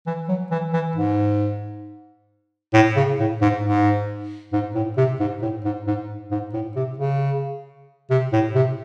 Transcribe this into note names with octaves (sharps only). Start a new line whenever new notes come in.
E3
F#3
E3
E3
G#2
A2
C#3
A2
G#2
G#2
G#2
A2
C3
G#2
A2
G#2
G#2
G#2
A2
C3
C#3
C3
A2
C3